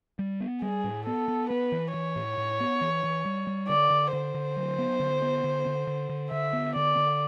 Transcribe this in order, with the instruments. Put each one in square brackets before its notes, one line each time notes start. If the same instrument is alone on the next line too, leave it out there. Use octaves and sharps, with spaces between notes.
[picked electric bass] G3
B3
[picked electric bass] G3 [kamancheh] G#4
[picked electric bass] A2
[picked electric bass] B3 [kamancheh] A4
[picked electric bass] B3
[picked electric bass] B3 [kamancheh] B4
[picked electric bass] E3
[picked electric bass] E3 [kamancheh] C#5
[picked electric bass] A2
A2
B3
E3
E3
G3
G3
[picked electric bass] D3 [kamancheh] D5
[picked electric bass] D3
[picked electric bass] D3 [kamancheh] C5
[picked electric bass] D3
F#3
B3
D3
B3
D3
D3
D3
D3
[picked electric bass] D3 [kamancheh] E5
[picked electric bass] B3
[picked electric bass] D3 [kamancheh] D5
[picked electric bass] D3